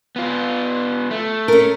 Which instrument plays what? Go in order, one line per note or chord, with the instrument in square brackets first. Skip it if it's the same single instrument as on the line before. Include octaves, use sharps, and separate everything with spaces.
[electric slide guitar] B3 F4
A3
[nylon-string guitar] C#4 A#4